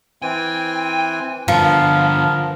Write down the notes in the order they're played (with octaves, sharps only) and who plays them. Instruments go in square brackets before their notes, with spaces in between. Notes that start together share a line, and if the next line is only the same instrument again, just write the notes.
[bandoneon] E3 C4 G#5 [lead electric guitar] G5
[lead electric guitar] G2 D3 [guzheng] F3 [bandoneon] B3 A#4